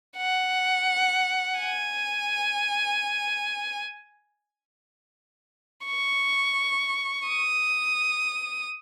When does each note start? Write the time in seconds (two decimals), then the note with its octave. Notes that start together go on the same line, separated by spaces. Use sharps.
0.17 F#5
1.59 G#5
5.86 C#6
7.27 D#6